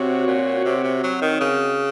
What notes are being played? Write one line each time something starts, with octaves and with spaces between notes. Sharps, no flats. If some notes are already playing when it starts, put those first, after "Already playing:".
Already playing: C3 C4 F#4 C#5
A#2
C3
C3
F#3
D#3
C#3